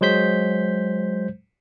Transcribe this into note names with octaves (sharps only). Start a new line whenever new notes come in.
F#3 G#3 C5 G6 B6